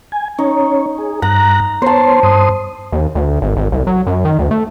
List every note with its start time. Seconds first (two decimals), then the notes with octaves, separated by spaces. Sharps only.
0.12 G#5
0.39 C#4 D#4 C#5
0.98 G#4
1.22 G2 A#5 F#6 A#6
1.82 B3 C5 C#5 A5 C6
2.23 G2 C6 D#6
2.92 D#2
3.15 D2
3.42 G#1
3.57 G#1
3.72 C2
3.87 F#3
4.07 F#2
4.25 D#3
4.39 D2
4.51 A3